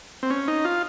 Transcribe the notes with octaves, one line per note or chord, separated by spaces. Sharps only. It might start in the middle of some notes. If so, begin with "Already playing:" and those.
C4
C#4
D#4
F4